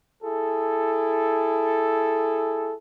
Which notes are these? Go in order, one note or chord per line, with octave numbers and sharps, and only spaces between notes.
E4 G#4 A4